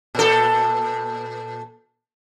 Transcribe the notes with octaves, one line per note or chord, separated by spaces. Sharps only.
A#2 A4